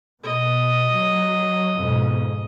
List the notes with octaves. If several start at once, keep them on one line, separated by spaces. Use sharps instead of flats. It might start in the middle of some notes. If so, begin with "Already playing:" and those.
B2 D#5
F#3
F2 G#2 B2